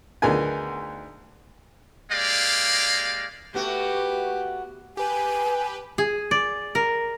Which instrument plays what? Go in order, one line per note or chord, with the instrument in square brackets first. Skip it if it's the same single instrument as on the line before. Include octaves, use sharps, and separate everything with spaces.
[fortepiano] D2 D#3 B3 D#4 G#4 G#5
[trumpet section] G#3 A#3 G4 D5 F5
[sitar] A3 B3 F#4 [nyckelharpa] G4
[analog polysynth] G4 B4 [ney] G#5
[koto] G#4
D5
A#4